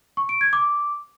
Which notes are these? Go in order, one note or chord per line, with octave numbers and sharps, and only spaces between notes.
C#6
D7
G#6
D6